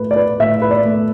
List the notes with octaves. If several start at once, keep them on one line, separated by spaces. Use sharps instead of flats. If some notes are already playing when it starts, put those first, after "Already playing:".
Already playing: A2 A3 B4
D5
B4
A2 E5
B4
D5
A3